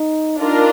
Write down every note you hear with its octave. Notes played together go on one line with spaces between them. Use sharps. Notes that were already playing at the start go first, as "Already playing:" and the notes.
Already playing: D#4
D4 D#4 F4 A#4